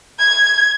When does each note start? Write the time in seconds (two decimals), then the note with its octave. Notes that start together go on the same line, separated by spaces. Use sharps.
0.19 G#6